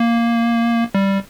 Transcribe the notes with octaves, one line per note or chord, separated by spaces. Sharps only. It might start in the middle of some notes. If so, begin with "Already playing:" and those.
Already playing: A#3
G3